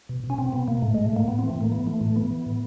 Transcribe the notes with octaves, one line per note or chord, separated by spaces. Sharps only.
B2
B2
C#4
B2 C4
B2 B3
B2 A#3
A2 A3
A2 G#3
A3
A2 A#3
A2 B3
E3 C4
A3
A2 A#3
E3 B3
E3 A3
A2 A3
E3 B3
E3
A2